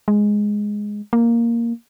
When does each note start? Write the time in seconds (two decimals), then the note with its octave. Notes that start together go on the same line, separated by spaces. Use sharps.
0.08 G#3
1.13 A#3